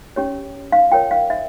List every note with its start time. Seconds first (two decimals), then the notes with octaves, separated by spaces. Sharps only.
0.16 C#4 G4 C#5
0.72 F5
0.92 F4 A#4 C#5 G5
1.11 F5
1.30 E5